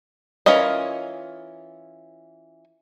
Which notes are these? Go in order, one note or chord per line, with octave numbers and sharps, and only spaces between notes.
E3 C#4 F4 A#4 D#5